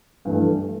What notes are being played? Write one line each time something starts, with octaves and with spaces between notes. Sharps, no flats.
G2 E3 A3